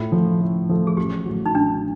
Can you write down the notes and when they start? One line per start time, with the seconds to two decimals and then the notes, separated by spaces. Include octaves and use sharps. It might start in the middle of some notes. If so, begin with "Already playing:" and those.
Already playing: A2 F4
0.12 F3 A3
0.41 A2
0.69 F3 A3
0.87 G#4
0.97 A1 G4
1.26 A2 F#3
1.46 D#4
1.54 A1 D4